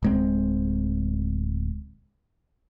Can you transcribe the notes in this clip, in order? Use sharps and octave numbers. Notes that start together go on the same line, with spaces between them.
D1 G#3 C4